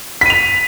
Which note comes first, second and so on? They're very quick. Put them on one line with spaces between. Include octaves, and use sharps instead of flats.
B6 D#7 F7